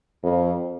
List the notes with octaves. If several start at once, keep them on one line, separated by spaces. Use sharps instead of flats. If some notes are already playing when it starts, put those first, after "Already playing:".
F2